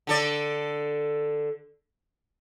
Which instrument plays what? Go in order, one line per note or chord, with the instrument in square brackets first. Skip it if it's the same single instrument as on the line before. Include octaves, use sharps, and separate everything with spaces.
[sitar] D3 A4 D5